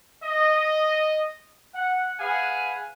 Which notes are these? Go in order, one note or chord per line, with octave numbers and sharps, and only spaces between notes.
D#5
F#5
G#4 B4 F5 F#5 G#5